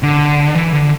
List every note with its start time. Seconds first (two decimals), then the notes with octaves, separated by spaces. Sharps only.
0.03 D3
0.55 E3
0.72 D3